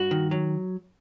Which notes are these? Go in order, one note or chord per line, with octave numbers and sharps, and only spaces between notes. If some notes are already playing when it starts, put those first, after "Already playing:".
Already playing: G2 F#4
D#3
F#3